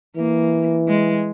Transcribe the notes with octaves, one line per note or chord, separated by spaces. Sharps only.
E3 A#3
G#3